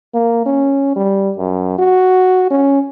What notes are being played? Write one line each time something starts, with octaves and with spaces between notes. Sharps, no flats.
A#3
C#4
G3
F#2
F#4
C#4